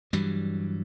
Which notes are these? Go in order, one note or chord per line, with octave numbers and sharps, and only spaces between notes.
G2 E3 F#3 G3